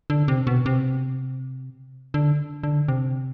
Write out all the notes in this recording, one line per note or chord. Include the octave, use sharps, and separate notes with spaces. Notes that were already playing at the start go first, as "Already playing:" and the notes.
D3
C3
B2
C3
D3
D3
C3